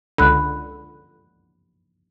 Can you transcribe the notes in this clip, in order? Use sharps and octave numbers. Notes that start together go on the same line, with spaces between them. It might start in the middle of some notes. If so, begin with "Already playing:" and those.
C#2 D3 B5 F#6